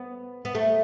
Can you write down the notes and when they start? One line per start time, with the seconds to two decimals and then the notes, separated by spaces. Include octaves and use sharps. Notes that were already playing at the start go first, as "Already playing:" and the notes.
Already playing: B3
0.45 B3
0.55 A3